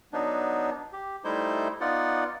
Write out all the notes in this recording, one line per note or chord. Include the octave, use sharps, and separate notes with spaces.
F#3 B3 D4 D#4
G4
G3 A3 D#4 E4 C5 G6
B3 D#4 F4 D5 F#5